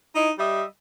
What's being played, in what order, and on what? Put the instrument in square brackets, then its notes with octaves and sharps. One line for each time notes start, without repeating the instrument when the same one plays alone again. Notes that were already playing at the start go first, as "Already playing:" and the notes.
[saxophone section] D#4 E4
G3 D#5 E5